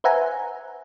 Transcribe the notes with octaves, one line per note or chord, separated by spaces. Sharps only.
B4 C5 E5 F#5 G#5 A#5